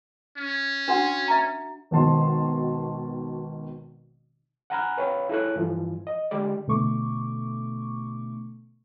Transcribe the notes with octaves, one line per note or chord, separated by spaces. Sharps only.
C#4
D4 F#4 F#5
E5 A#5
G#1 B2 D#3 F#4 A5 C6
F#5 G#5 A#5 B5 F6 F#6
B4 C#5 F5 G5 B5
E4 G#4 A4 C#5 F#6
G2 E3 F3
D#5
D3 G#3 G4 D5
B2 D3 A3 C#6 D6